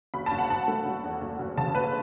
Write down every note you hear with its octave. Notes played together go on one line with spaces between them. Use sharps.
F#1 B5
A5
F#1
F#5
F#1 A5
A3
F#1
E2
F#1
F#1
C#3 A5
F#1 B4